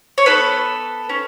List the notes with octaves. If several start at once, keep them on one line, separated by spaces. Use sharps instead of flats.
C#5
B3 E4 A4 B4
C#4